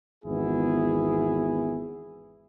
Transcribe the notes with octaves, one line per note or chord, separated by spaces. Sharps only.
G#1 E2 B3 E4 G#4